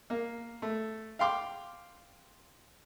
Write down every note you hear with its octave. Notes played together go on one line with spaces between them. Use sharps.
A#3
A3
F5 G5 C6 D6